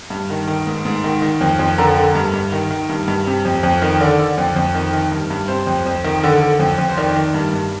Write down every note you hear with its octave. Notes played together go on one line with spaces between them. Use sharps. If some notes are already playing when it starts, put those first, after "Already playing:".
G2
D#3
D#3
G#2
G#2
D#3
D#3
F2
F2
D3 A#4
D3
G2
G2
D#3
D#3
G2
G2
C3
F2
F2
D#3
D3 D5
D3
F2
F2
D#3
D#3
G2
G2
C3 C5
F2
F2
D#3
D3
D3
F2
F2
C5
D#3 D5
D#3
G2
G2